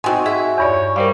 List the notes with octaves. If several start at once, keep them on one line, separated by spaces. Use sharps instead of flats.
G#2 B3 C4 D#4 F#4 G#5
G#4 E5
E2 G2 C#5 D5
G3 A#4 C5 F5